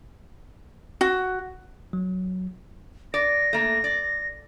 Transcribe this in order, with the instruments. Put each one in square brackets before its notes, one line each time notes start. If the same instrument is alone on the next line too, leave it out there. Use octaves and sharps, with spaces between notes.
[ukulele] F#4
[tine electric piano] F#3
[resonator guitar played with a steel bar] D5 [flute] A#6
[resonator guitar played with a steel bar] A3 A#3
D5